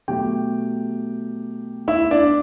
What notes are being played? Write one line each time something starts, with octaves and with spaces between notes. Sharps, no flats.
B2 F#3 A3 G4 G5
E4 E5
D4 D5